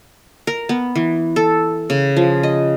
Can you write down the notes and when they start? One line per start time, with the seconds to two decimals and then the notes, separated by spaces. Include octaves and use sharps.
0.47 A#4
0.69 B3
0.96 E3
1.36 A4
1.90 C#3
2.17 F3
2.43 D#5